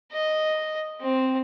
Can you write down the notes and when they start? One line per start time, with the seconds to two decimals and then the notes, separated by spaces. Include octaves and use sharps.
0.12 D#5
1.01 C4